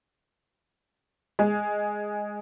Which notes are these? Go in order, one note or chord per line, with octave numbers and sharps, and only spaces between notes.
G#3